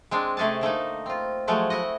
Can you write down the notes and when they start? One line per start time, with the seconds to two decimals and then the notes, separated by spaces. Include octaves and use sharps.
0.11 G#3 C4 D4
0.37 C3 A3 C#4 G#4 A5
0.61 D3 A3 A#3 D#4
1.06 C4 F4
1.48 F3 F#3 G#3 A3
1.70 E4 F#4 D#5